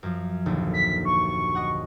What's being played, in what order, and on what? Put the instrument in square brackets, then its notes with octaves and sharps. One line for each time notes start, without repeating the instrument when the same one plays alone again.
[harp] F#2 F3
A#1 D#2 D3
[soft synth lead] B6
C#6
[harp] D#5 F#5